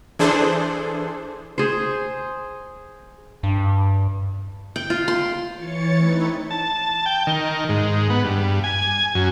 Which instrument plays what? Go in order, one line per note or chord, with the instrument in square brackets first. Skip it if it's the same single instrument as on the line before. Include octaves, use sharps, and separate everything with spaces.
[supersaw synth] E3 D4 G#4 A4 C5
[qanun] G#4 C5
[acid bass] G2
[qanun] G5
F4
C6
[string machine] E3 C#5 A6 C#7
A3 C4 D#4 E4 B4
[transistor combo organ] A5
G5
D#3
G#2
B3
G2
G#5
F#2